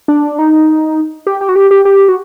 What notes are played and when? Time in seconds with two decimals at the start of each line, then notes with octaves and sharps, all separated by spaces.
0.08 D4
0.39 D#4
1.27 G4
1.41 G4
1.49 F#4
1.56 G4
1.71 G4
1.85 G4
2.09 F#4